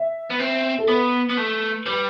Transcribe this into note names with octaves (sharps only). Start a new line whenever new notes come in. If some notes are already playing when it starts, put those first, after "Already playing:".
Already playing: E5
B3
C4
A4
B3 B4
B3
A3
G3 B4